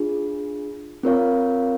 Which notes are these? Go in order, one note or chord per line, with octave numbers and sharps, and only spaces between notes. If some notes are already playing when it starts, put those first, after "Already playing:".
Already playing: D4 F4 G#4
C4 F4 A#4 C#5 F5